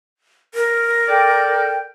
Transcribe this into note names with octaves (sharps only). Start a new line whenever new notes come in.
A#4
A4 D5 G5